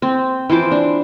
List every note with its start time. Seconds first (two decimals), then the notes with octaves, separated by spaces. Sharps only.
0.02 C4
0.49 E3 F3 C5 D6
0.71 D4